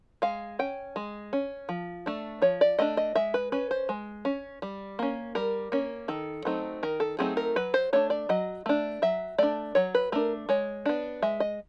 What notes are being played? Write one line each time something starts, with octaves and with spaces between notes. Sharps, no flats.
G#3 F5
C#4 G5
G#3
C#4
F3
A3 D4
F3 C#5
D5
A3 D4 D#5
D#5
G#3 E5
B4
C#4 B4
C5
G#3
C#4
G3
A#3 C#4
G3 A#4
A#3 C#4
D#3 A4
F#3 A3 C4 D#4
D#3 A#4
A4
F#3 A3 C4 D#4 G#4
A#4
F#3 B4
C5
A3 D4 C#5
D5
F#3 D#5
A3 D4
F#3 E5
A3 D4 D5
F#3 C#5
B4
A3 D4 A#4
G#3 C#5
B3 D4
G#3 E5
D#5